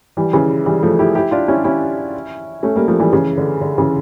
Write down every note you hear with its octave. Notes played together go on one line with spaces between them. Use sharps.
E3 G3
C#3 E3
E3 G3
F3 A3
E4 G4
E4 G4
D4 F4
C#4 E4
C#4 E4
A3 C#4
G3 A#3
F3 A3
E3 G3
C#3 E3
D3
D3
C#3 E3